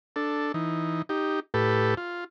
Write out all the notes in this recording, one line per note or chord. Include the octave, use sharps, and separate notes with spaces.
D4 A4
E3 D#4
D#4 G4
A2 G4 A4 B4
F4